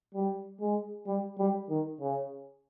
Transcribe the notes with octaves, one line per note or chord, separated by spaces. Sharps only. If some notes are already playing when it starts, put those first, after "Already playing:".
G3
G#3
G3
G3
D#3
C#3